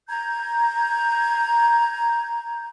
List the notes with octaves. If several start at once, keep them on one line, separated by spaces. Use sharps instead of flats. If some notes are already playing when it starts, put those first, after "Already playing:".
A#5 G6 G#6